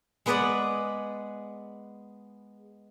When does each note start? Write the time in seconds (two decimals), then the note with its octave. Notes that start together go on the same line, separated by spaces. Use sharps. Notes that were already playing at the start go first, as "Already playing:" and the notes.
0.26 G#3 B3 G#4 B4 D5 F#5